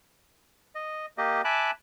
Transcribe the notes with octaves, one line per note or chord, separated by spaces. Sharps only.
D#5
A#3 G4 D#5
E5 G#5 A5 B5 D6 F#6